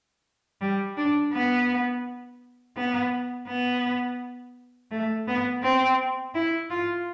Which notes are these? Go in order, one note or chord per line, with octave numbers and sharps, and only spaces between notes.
G3
D4
B3
B3
B3
A3
B3
C4
E4
F4